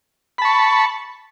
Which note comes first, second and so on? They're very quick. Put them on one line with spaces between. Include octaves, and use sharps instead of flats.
B5 A5 C#6